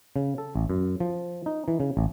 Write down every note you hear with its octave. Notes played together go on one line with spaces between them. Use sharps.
C#3
A4
A1
F#2
F3
D#4
E3
C#3
A1